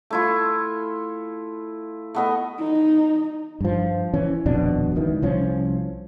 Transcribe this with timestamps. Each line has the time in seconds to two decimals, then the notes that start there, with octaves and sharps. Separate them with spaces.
0.10 A3 E4 F4
2.14 A3 B3 D#5
2.59 D#4
3.61 G2 F3
4.14 E3 C#4
4.46 D#1 F2 B2 D4
4.95 C#2 D#3 E3
5.22 C2 F3 C#4